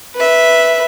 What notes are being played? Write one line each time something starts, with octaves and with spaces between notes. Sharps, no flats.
B4 E5